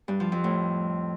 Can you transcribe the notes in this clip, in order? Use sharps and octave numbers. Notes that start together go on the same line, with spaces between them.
G2
F3
F2
A2